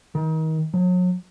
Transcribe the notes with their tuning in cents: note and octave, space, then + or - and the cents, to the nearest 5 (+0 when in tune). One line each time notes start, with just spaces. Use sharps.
D#3 +30
F#3 -35